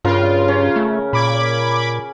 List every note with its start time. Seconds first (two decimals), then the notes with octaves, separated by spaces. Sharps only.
0.05 G2 C#3 F4 A#4
0.48 C#4
0.76 A3
1.13 A#2 B5 D6 G#6